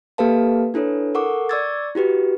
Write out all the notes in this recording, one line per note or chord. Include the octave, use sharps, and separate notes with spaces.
A#3 G4 A4 B4 F5 A5
D4 E4 A4 B4 C#5
A4 A#4 F#5 C#6 D6
D5 C#6 D6 E6 G#6 A6
E4 F#4 G4 B4